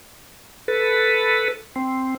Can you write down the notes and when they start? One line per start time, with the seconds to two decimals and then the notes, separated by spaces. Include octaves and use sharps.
0.68 A4 B4
1.76 C4